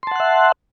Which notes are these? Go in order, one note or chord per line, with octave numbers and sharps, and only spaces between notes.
E5 F#5 A5 C6 F#6